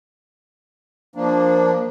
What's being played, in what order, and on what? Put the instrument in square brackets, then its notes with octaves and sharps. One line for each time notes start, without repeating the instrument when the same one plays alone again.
[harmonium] F3 A#3 D4